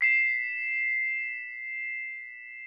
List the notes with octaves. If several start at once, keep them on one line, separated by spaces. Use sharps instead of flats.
B6 C7 E7